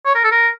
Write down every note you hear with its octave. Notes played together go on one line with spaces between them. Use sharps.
C#5
A#4
A4
A#4